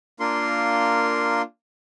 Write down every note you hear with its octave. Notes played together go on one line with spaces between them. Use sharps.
A#3 D4 F4 A#4 C6